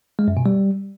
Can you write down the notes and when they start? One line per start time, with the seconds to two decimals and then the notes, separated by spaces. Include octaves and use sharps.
0.19 G#3
0.28 F#2
0.37 B2
0.46 G3